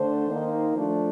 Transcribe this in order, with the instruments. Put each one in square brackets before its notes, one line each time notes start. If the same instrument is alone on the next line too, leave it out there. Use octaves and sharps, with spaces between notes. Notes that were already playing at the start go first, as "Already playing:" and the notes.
Already playing: [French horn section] D3 A3 D4 C5
D#3 A#3 D#4
F3 A3 D4